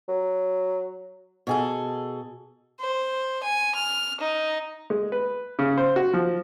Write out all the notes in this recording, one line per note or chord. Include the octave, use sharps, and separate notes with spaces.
F#3
B2 G#4 A4
C5
G#5
F6
D#4
G#3
B4
C#3
C5
F#4
F3